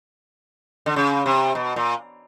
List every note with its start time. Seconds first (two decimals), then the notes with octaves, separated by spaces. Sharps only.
0.86 D3
0.96 C#3
1.26 C3
1.55 B2
1.76 A#2